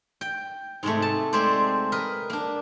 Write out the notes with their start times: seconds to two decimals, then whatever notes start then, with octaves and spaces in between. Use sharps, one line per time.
0.21 G5
0.83 G#2 C3 G#3 A3
1.02 A5
1.33 G#3 A3 C4 C5 D5
1.92 A#4 B4 D#5
2.30 A#3 D4